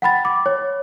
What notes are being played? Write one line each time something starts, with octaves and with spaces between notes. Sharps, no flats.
F#5 G5 B5 A6
D6
C#5